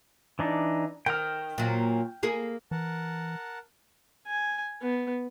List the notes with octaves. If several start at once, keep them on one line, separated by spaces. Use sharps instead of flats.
E3 D4 D#4
D#3 G5 F6
A#2 F#3
A#3 G#4
E3 A#4 F#5 A5
G#5
B3